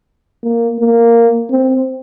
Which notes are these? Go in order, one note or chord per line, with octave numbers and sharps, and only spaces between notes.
A#3
A#3
C4